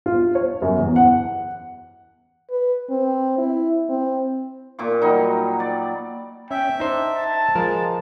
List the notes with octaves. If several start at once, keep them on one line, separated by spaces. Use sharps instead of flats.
F4
C#5
F#2
E2
F#5
B4
C4
E4
C4
A#2 F4 C#6 D6
F#3 G3 D#4
D5
C#4 E5 G5
D4 D#4 C5
A5
F3 G#3 A#4